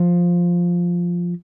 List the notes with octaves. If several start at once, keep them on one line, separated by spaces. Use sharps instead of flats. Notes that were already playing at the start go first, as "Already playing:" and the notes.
Already playing: F3